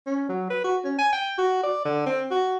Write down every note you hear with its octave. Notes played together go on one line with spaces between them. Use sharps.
C#4
F#3
B4
F#4
C#4
G#5
G5
F#4
D5
D3
C4
F#4